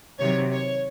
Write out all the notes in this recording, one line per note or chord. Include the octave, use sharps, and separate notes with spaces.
C3 D#3 F#3 C#5
C#5